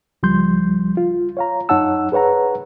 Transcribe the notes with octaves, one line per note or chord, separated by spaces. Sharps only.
C#2 F3 G3 C6 G6
F4
C#5 F5 A#5
F#2 D#4 C#5 F#5 A5 E6
G#4 B4 C#5 F#5 A#5